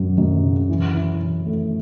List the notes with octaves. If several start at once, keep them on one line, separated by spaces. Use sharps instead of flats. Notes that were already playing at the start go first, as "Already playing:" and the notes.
Already playing: F#2 F#3
F#2
C#3
E3
E4
E3
A3